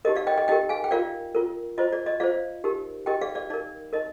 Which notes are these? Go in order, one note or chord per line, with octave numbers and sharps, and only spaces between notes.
D#4 G4 A#4 D#5
D5 F5
D#5 G5
D#5 G5
D#4 G4 A#4 D#5 G5
F5 G#5
G5
F4 A#4 D5 F5
F4 A#4
F4 C5 D#5
D5
D#5
F4 C5 D5 F5
D#4 G4 A#4
D#4 G4 A#4 D#5 G5
D5 F5
D5 F5
D#4 A#4 D5
D#4 A#4 D#5